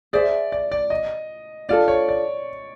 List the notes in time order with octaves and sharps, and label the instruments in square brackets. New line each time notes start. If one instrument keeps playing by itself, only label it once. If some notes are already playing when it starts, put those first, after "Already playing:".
[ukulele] G#4 C5 E5 [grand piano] D5
[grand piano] D5
D5
D#5
[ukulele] D4 F4 A4 [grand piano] D5
[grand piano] C#5
D5